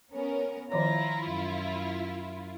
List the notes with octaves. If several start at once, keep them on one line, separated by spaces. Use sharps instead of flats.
B3 C#4 A#4
D#3 F3 E4 F4 C#5 A#5
F#2